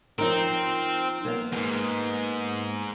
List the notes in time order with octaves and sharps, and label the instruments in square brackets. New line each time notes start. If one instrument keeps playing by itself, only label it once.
[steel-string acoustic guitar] F3 D#4 A#4 [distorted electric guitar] C4
[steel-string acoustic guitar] A#3 B3 F5
[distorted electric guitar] E2 G#2